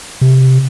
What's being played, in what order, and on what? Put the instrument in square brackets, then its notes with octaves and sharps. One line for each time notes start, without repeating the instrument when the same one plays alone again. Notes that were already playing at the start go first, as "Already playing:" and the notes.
[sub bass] C3